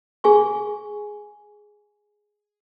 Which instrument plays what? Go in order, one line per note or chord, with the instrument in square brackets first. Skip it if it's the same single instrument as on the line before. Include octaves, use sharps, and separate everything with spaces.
[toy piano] G#4 G#5 C#6